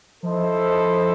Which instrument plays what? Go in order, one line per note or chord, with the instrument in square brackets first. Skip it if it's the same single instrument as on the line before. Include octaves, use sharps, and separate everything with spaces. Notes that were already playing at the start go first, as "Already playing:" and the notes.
[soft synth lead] F3 [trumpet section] E4 A4 C5 D#5